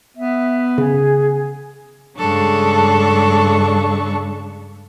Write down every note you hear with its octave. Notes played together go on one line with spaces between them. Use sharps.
B3 E5
C#3 G#4
G2 C#3 G#3 D4 A4 C#6